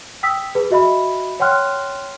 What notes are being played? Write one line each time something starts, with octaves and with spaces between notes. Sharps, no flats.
G5 D#6 E6 B6
G#4 B4
F#4 D#5 E5 B5
C#5 F#5 G5 C6 F6 F#6